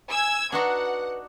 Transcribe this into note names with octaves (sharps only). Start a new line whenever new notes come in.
G#5 E6 G#6
D4 D#4 F#4 B4 F#5